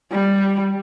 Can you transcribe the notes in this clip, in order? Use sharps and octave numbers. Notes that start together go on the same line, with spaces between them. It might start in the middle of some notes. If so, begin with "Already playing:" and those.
G3